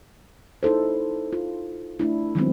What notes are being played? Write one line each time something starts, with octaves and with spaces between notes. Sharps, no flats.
D#4 E4 A4 C5
F4
A3 D4 E4
D#3 F3 F#3 G#3 B3 C4